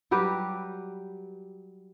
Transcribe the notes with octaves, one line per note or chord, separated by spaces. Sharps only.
F#3 G3 G4 B4